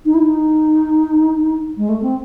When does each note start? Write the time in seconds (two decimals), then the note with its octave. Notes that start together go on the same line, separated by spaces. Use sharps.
0.05 D#4
0.14 E4
0.23 D#4
1.77 G#3
1.89 A3
2.03 C4